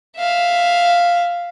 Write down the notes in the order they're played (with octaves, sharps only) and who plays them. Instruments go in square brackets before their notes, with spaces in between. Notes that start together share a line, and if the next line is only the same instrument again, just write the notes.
[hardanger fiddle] E5 F5